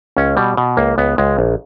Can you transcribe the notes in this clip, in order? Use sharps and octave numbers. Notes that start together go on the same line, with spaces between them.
C#2 C#4
B2 G3
B2
C#2 A#3
C#2 B3
C#2 G#3
A#1